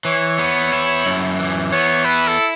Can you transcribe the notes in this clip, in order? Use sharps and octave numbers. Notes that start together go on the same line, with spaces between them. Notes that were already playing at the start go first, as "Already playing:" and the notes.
E3 C#5
B3
E4
F#2
E3
B3 C#5
E4 B4
A4